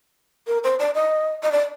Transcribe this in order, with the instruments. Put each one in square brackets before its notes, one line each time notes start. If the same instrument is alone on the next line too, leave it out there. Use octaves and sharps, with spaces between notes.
[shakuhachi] A#4
C5
D5
D#5
D#5
D5